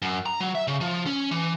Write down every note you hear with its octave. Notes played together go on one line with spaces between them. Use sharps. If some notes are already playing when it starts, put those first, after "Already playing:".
F#2
A#5
F#3
E5
C#3
F3
C#4
E3